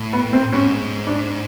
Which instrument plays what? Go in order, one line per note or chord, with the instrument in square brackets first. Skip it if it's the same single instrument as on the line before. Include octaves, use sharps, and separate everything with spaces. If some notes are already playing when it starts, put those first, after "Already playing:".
Already playing: [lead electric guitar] A2
[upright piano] B3
C4
[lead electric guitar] G#2 [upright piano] C#4
[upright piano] D4